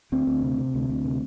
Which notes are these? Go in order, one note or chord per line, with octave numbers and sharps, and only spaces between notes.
D2 C4
D2
C3
C3
D2
D2
C3